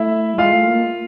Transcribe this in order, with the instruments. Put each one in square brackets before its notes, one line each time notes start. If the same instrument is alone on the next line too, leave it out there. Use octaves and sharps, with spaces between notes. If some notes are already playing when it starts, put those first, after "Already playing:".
Already playing: [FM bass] A3 [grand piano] E4 E5
[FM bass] G3
[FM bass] G#3 [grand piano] F4 F5
[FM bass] A3
A#3